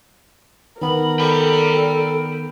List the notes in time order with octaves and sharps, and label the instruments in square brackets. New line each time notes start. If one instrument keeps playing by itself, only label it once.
[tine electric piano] D#3 B3 [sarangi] A#4 [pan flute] B5
[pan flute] A4 [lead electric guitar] G5 B5